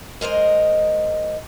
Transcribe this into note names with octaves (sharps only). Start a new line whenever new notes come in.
G#3 A#4 C5 D#5